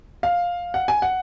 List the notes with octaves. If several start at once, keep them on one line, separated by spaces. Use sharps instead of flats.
F5
F#5
G#5
F#5